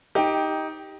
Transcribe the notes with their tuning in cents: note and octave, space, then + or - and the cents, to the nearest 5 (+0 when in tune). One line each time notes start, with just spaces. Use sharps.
D#4 +10 G4 +0 G5 +10